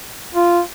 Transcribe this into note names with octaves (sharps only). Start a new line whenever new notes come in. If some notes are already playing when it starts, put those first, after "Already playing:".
F4